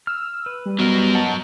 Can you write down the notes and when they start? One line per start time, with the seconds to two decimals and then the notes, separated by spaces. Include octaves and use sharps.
0.07 E6 F6
0.46 B4
0.66 G3
0.79 B2 F#3 A#4
1.15 D#5 F#5 A5